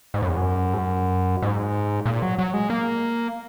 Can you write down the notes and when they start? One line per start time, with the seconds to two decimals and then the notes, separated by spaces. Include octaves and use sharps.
0.14 G#2
0.22 F#2
0.29 E2
0.37 F#2
0.74 G#2
0.78 F#2
1.42 G#2
2.06 A#2
2.22 F#3
2.39 F#3
2.54 G#3
2.70 A#3